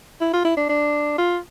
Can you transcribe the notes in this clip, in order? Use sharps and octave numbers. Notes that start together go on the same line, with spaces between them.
E4
F4
E4
D4
D4
F4